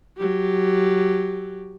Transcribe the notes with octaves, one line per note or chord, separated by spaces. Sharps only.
F#3 G4